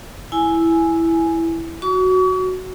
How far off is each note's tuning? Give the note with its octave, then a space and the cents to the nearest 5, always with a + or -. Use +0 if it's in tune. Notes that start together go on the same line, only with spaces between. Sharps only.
E4 +0 G#5 +10
F#4 +0 C#6 +40